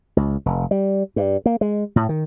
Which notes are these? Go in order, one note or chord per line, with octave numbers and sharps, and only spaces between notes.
C#2
F1
G3
G2
A#3
G#3
A2
D#3